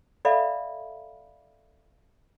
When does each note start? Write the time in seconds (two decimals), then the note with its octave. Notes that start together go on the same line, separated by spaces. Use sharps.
0.25 A4 D5 E5 F5 B5